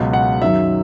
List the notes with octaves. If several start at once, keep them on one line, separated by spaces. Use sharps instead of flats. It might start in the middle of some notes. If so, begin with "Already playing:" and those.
Already playing: C#2 B2 F#3
F#5
F#2 D#3 F#3 E5